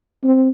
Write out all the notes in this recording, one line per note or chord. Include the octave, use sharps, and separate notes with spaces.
C4